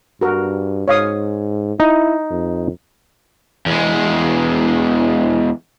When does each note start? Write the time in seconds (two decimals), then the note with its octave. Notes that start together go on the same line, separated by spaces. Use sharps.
0.21 G2 F#4 A#4
0.88 G#2 C#5 F5 D#6
1.80 D#4 E4
2.30 F2
3.66 E2 G#3